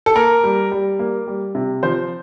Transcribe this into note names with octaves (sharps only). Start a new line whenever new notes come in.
A4
A#3 A#4
G3
G3
A#3
G3
C3
F3 C5